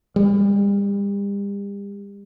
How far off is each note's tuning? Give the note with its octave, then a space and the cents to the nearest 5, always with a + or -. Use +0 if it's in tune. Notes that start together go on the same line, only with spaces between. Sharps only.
G3 +40